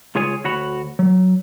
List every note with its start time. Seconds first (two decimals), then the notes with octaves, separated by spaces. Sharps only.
0.15 C#2 F4 G#4 C#5 G#5
0.45 D2 F#4 C#5 B5
0.99 F#3